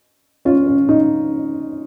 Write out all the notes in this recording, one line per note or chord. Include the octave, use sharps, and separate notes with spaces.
C#4 F4
C#4
D#4